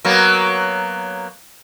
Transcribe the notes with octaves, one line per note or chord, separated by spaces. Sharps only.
F#3 A#3 B3